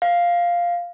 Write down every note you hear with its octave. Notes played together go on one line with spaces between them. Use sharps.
F5